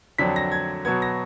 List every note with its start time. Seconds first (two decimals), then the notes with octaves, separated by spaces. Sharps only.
0.18 F2 D3 F#3 D4 B6
0.36 A#6
0.52 G#6
0.85 B2 F#3 B3 G#6
1.02 A#6